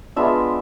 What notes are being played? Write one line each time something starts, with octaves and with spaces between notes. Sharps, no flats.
G#3 B3 D4 F4 E5